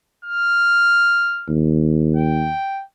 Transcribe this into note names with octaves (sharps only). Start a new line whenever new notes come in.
F6
D#2
G5